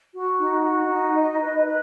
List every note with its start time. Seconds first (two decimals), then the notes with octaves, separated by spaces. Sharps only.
0.13 F#4
0.39 D#4
0.64 F#4
0.89 D#4
1.15 D#5
1.40 B4
1.65 B4